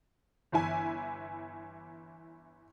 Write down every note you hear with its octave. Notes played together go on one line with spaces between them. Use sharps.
G1 E3 E4 G#5